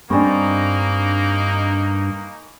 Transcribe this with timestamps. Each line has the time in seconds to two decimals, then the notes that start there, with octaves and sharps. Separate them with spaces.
0.10 G2 A#3 C4 D4 D#4 G#5 B5 C#6